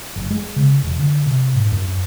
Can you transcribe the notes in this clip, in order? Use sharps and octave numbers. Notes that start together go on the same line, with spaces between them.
F#1
G#3
C#3
E1
D3
C3
G#2
F#2